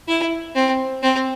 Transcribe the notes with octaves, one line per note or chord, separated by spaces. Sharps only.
E4
C4
C4